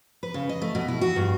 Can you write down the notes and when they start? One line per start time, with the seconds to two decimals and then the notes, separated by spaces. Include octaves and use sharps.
0.23 B4
0.34 C#3
0.49 D#5
0.62 A3
0.75 B2
0.88 E4
1.01 F#4
1.16 G2